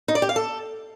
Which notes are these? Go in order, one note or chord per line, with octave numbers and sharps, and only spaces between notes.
D#4
D5
G4
F5
A4